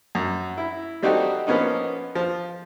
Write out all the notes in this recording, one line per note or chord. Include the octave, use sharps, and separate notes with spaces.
F#2
E4
G3 C4 D#4 F#4 G4 A4
F3 A#3 B3 C#4 D#4
F3